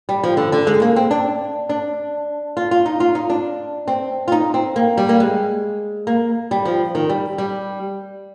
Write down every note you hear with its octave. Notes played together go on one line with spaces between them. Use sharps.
G3
F3
D3
D3
G#3
A#3
C4
D4
D4
F4
F4
D#4
F4
D#4
D4
C4
F4
D#4
C4
A#3
G3
A#3
G#3
A#3
G3
F3
D#3
G3
G3